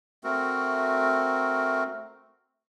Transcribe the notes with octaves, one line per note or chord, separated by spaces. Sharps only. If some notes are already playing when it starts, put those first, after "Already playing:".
A3 C4 F#4 A#4